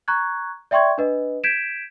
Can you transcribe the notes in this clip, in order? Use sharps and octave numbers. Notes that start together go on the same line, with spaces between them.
A#5 C#6 F#6 G#6
D5 E5 G5 C6 C#6 G#6
D4 B4 D#5
G6 G#6 B6 D7 E7